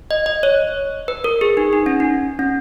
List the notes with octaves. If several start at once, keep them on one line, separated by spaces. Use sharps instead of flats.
D#5
D#5
C#5
B4
A#4
G#4
D#4
D#4
C#4
D#4
C#4